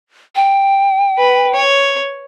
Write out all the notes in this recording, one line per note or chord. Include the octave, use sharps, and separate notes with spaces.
G5
B4
C#5